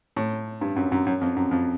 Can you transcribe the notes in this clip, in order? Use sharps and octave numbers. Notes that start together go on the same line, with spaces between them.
A2
G2
F#2
F#2
F#2
F2
F#2
F2